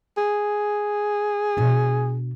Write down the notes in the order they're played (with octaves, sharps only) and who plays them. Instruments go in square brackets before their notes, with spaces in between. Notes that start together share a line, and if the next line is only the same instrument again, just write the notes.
[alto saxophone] G#4
[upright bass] B2 D4